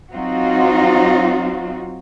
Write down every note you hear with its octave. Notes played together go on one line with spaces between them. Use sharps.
F#3 C4 D#4 F4 F#4